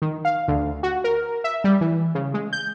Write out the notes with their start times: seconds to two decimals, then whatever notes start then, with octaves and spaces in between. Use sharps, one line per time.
0.02 D#3
0.25 F5
0.48 D2
0.83 F#4
1.04 A#4
1.44 E5
1.64 G3
1.81 E3
2.15 C#3
2.34 G#3
2.53 G6